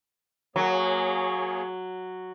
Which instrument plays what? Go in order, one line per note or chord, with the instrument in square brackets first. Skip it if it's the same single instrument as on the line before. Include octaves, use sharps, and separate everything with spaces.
[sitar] F#3 [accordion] A#3 G#4 C#5